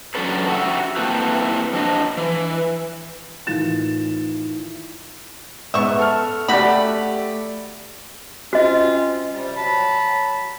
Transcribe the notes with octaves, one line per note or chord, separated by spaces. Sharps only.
F#3 C#4 D4 A4 B4
F#4 G4 E5 F#5
A#3 C4 E4 G4 A4 B4
F3 D4 D#5
E3
A2 D#3 E3 F4 A6 E7
G#2 B3 E5 C#6
A4 F6
A3 F#4 G4 D5 B5
C4 C#4 F4 F#4 D#5
C3 G3
F#3 A5 B5